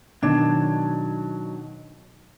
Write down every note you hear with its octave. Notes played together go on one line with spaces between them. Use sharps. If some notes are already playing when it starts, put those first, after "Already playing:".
B2 D#3 F#3 D4 C#5 A5